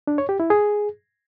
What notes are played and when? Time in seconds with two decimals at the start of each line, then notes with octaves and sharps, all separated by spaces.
0.07 D4
0.18 C#5
0.29 G4
0.40 E4
0.50 G#4